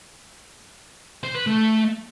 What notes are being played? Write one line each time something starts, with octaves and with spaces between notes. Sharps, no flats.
C5
B4
A3